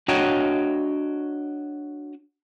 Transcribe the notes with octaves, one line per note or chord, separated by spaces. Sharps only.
D4 F#4 C#5 D#5 G5 A#5